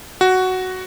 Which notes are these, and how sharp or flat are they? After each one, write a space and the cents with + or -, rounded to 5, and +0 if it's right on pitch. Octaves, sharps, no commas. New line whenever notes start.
F#4 +5